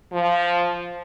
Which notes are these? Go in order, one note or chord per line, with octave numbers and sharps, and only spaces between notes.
F3